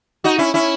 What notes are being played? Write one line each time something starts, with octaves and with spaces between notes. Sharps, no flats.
D#4 F#4
C#4 E4
C#4 E4